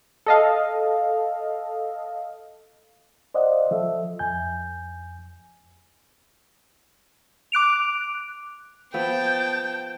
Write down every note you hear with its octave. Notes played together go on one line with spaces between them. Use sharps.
A4 D#5 F5
C5 D5 D#5 F5 F#5
F3 A4 E5
F2 G#5 G6
D6 F#6 D7 F7
F3 B3 G5 A5 G6